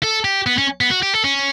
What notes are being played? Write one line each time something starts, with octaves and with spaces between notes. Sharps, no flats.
A4
G4
B3
C#4
B3
F#4
G4
A4
C#4